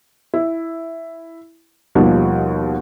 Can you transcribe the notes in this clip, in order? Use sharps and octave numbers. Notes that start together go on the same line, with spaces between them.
E4
D#2 B2 F3 G3